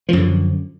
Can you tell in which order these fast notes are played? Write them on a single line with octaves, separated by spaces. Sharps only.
F3 F#2 D3